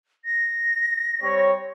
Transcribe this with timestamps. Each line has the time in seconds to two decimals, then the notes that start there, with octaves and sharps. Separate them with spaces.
0.25 A#6
1.22 G3 C4 C#5